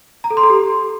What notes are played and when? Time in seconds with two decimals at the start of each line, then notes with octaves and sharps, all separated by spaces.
0.24 A#5
0.30 A4
0.37 C6
0.43 A4
0.50 G4